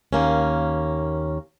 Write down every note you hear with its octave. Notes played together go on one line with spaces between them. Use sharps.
D#2 A#3 C#4